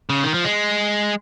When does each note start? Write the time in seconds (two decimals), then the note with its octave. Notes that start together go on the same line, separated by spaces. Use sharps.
0.09 C#3
0.24 D#3
0.34 F3
0.45 G#3